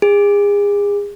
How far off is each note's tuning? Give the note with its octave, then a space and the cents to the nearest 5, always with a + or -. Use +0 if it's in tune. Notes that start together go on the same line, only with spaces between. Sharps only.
G#4 -35